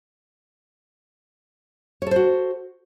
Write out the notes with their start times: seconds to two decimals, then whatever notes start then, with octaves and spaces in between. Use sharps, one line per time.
2.02 C#5
2.07 A4
2.11 C5
2.16 F#4